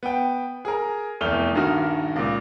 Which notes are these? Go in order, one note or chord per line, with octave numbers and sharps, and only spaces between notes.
B3 G5
G#4 A#4
F1 E2 A3 F6 F7 G7
D#1 G2 D#3 D#4 F#4 F6
C#2 A#2